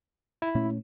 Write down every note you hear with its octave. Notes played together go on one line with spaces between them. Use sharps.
E4
A#2 A3 C#4